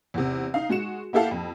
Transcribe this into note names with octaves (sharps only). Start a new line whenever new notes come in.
E2 C3
D#4 F5
G#3 F#4 C#7 E7
A#3 E4 G4 A4 F5 F#5
F2